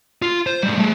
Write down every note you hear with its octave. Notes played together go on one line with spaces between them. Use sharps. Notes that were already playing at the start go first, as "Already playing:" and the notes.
F4
C5
A2 G3
A3 G#4